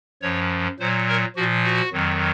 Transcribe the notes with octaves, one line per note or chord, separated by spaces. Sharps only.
F#2 F3 C#5
A#2 F#3 C5
A#4
A#2 F3 F#4
F#4
F2 D#3 F#3